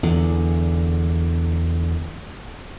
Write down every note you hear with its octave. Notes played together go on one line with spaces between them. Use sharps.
E2 D3